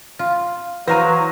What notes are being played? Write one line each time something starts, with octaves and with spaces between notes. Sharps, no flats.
F4
E3 F#3 B4 C5 F5 G#5 A#5 A#6